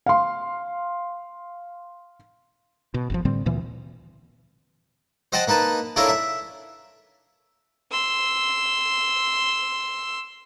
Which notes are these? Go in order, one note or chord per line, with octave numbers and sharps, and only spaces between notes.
F5 C6
B2
G1 B2 F3
A2 D3 G3 C4
D2 A#2 E3
C5 D#5 F#5 G5 A5
A#3 D#4 B4 A5
D4 E4 F4 A4 A#4 C#5
E5
C6 E6